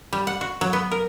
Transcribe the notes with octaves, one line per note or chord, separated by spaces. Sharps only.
G3
F#5
F#4
F#3
B3
A#4